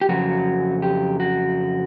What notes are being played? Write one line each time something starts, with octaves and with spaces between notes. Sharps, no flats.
G4
F2 C#3 F#3 F#4
G4
F#4